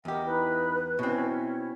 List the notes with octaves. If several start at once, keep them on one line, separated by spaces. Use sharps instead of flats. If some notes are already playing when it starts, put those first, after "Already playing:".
E2 G4 A#4 D#5 F#5
D#4 E4 B4 B5
B2 C4 C#4 E4 C#5